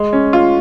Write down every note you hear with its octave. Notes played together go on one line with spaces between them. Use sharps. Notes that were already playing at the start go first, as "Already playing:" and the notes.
Already playing: G#3
C#4
F4